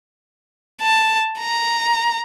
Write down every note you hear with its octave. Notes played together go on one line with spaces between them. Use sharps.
A5
A#5